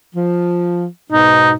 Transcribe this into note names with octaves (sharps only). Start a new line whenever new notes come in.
F3
G#2 B2 D#4